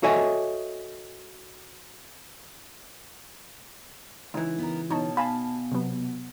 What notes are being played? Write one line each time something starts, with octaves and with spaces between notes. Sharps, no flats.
F#4 A4 C#5 D#5 E5 G#5
C#2 E3 D#4
B3 A#4
B2 D#4 C#5 A5
F5 G#5 A5 B5
C3 F#3 B3